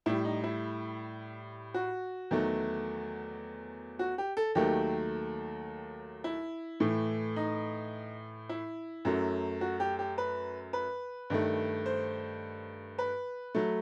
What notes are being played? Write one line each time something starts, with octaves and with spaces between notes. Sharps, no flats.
A2 G3 E4
D#4
E4
F#4
E2 D#3 F#3 A3
F#4
G4
A4
D#2 D#3 F#3 A3 G4
E4
A2 E3 A3
D#4
E4
F#2 F#3 A3
F#4
G4
G4
B4
B4
G2 D#3 A3
C5
B4
F#3 A3